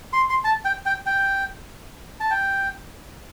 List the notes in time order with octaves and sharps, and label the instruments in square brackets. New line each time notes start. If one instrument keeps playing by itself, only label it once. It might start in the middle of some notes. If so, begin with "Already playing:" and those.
[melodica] C6
C6
A5
G5
G5
G5
A5
G5